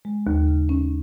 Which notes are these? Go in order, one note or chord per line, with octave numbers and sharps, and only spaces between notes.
G#3
D#2
C#3
C#4